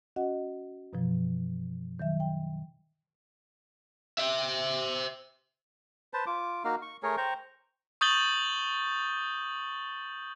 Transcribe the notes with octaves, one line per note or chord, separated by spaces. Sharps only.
C#4 F#4 D#5 F#5
F#2 B2 E3 F3
D#3 F#3 E5
G5
C5 E5
B4 C5 A5
F4 D6
A#3 D#4 F#4 F5
C#6
A3 G#4 A#4 C#5
C5 G5 A#5 C#6
C#6 D#6 G6 A6 F#7 G7